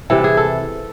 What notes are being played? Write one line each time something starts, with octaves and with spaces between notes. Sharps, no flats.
C3 E3 A4
G#4
A4